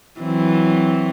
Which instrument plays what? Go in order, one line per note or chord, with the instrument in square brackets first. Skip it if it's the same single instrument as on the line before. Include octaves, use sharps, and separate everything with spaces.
[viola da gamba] E3 F#3 C4